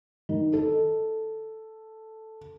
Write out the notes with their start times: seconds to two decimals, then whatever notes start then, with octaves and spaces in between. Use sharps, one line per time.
0.29 D#3
0.53 A4